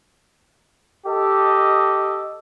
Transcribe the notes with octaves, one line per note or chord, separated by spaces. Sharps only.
G4 A4 D#5